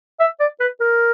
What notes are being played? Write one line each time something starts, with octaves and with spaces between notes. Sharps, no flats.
E5
D5
B4
A#4